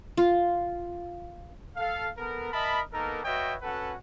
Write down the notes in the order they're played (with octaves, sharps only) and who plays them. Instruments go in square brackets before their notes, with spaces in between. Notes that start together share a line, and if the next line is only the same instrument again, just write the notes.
[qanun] F4
[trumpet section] A4 F5
B3 A4 A#4
A#4 D#5 E5 A5 B5
A#3 B3 D#4 A4 A#4
F#4 B4 C#5 D#5 E5 G5
C#4 F#4 A4 B4 F#5